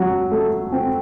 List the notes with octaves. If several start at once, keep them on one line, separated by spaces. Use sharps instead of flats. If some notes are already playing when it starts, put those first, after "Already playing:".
Already playing: F#3
A3
C4